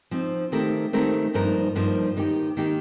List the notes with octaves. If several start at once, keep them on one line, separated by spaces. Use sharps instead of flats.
F3 C4 D#4
D#3 A3 C4 G4 A#4
D#3 A3 C4 G4 A#4
G2 F3 A#3 D#4 A#4
G2 F3 A#3 D#4 A#4
D#3 A#3 D#4 G4
D#3 A#3 D#4 G4